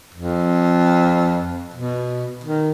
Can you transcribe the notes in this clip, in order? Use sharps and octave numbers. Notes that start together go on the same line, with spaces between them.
F2
B2
D#3